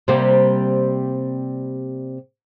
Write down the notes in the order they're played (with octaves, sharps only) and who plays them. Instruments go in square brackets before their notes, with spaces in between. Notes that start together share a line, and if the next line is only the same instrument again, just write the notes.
[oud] C3 G3 A#3